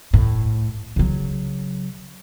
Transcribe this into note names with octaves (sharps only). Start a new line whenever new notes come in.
A2
C#3 F#3